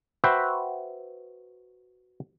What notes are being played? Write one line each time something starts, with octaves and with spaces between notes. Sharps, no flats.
F#4 B4 C5 E5 G5